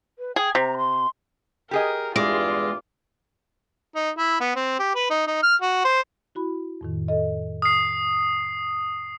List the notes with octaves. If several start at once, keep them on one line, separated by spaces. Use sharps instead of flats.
B4
G#4 G5
C3 A#5
C6
G4 G#4 A#4 D#5
E2 G2 G#3 F4 D6
D#4
E4
B3
C4
G4
B4
D#4
D#4
F6
F#4
C5
E4 F#4 B5
F2 A2 D#3
A4 D#5
D#6 F6 C7